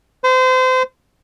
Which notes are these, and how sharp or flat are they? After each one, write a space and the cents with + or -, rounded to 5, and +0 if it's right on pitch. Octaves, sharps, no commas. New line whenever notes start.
C5 -30